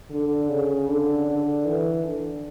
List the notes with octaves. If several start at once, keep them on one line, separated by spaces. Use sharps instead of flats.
D3
C#3
D3
D3
E3
D3